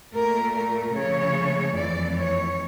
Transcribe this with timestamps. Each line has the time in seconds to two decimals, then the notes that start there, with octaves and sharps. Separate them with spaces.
0.14 A#2 A3 A#4
0.54 A#4
0.95 C#3 F3 A3 C#5
1.77 F2 E3 A3 D5
2.18 C#5